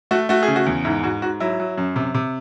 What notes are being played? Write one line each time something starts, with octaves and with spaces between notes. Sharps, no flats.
A3 F#4
A3 F#4
G#4
C#3
F#4
E2
G#2 E4
G#2 F#4
G#2 F#4
F#3 E4
F#3
F#2
C3
C3